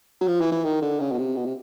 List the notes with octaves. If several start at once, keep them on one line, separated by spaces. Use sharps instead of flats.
F#3
F3
E3
E3
D#3
D3
C#3
B2
C3
B2
C3